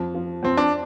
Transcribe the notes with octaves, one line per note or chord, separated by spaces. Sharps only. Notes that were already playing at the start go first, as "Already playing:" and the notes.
Already playing: F2
F3
F2 C4
D4